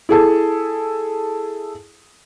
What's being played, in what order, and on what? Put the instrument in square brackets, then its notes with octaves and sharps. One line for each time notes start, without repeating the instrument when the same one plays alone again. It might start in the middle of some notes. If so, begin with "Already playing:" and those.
[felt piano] E4 G#4 A4